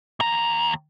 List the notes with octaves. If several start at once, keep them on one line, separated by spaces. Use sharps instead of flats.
D#2 A#5